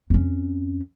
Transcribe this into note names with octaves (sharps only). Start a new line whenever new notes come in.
F2 C#4